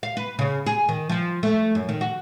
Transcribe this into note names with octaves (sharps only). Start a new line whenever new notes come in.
F5
B4
C#3
G#4
D#3
F3
A3
F#2
D#3
F#4